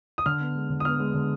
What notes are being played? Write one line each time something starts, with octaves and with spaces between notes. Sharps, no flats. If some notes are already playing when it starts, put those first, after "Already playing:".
D#6
D3 F6
B3
G#3
D3
D#6
B3 F6
G#3
D3